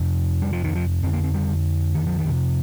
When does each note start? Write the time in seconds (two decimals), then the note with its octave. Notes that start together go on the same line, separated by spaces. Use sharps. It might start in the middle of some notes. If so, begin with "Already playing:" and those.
Already playing: F2 C3
0.42 G3
0.53 F3
0.64 D#3
0.75 F3
1.03 F2 D3 C4
1.13 A#3
1.24 C4
1.34 G3
1.95 D#3
2.07 F3
2.19 D#3
2.25 F2 C3